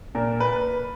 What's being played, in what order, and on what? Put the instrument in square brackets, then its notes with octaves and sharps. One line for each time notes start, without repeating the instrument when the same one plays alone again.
[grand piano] A#2 A#4
B4